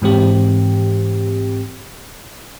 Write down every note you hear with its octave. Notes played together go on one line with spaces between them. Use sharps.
G#2 E3 C4 G4